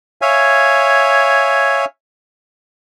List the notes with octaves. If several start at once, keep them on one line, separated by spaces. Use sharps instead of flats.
C#5 E5 F5 G#5